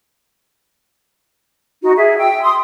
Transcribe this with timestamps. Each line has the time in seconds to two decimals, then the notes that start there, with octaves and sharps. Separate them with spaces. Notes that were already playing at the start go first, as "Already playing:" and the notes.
1.82 D#4 F#4
1.96 G#4 E5
2.17 G5 E6
2.43 C6 D#6